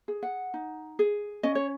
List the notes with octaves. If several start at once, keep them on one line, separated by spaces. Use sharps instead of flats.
G#4
F#5
D#4
G#4
C#4 D#5
C#5